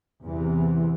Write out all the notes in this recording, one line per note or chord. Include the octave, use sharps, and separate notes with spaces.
E2 C3 E3